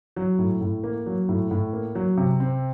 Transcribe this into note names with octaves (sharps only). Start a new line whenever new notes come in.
F#3
A2
A2
A#3
F#3
A2
A2
A#3
F#3
C3
C4